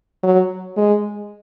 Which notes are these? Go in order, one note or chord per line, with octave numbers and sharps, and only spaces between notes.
F#3
G#3